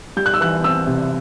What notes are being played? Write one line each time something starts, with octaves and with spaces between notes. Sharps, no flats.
G3 G6
F#6
E6
E3 F#6
C4 E6
C3